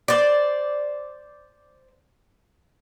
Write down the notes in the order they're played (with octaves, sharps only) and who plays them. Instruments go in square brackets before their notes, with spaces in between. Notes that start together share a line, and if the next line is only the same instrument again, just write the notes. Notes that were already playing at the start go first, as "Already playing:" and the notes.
[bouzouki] C5 D5